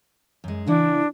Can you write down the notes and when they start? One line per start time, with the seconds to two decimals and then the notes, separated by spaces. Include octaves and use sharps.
0.44 F#2 G#3
0.67 C#3 E3 D4 E4